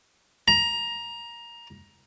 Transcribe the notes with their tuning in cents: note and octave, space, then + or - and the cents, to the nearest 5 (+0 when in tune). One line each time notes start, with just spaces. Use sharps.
A#5 +15